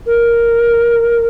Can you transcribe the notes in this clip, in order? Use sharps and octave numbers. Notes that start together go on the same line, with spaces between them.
A#4